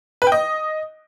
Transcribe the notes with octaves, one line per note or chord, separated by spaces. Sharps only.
B4
G5
D#5